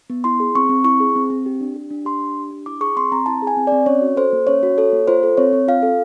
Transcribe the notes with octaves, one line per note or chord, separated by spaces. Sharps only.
B3
E4 C6
G#4
C4 C#6
C4
E4 C#6
G#4
C4
C4
G4
D4
G4
D4
G4 C6
D4
G4
D4
E4 D6
G#4 C#6
C4 C6
C4 A#5
E4 A5
G#4
G#5
C4
D5
C4
C#4 C#5
F#4
A4 C5
A#3
C#4 C#5
F#4
A4 C#5
A#3
F4 C5
A4
C4 C#5
C4
F4 F5
A4